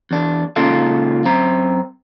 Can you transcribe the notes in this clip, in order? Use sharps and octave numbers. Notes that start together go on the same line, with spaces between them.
E2 D4
C#2 A#2 C#3 D#4 F4 A4
F#2 C4 A#5